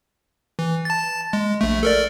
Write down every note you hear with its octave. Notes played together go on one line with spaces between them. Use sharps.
E3
A5 A6
G#3
A#1 A3
A4 A#4 D5